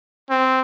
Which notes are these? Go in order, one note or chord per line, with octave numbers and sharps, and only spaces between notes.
C4